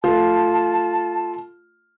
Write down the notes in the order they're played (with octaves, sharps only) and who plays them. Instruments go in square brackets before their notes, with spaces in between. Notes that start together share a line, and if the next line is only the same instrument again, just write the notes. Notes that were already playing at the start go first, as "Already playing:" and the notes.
[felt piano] A3 F4 [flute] A5